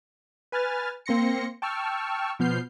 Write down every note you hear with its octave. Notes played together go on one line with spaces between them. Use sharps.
B4 G#5 F6 A6
A#3 C4 C6 A#6 C#7
G5 A5 C#6 E6 F6
B2 F3 B3 F6 G6 C7